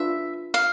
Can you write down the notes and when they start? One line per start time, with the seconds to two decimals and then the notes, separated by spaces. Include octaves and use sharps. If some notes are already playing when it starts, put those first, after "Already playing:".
Already playing: D4 F4 B4 E5
0.54 F5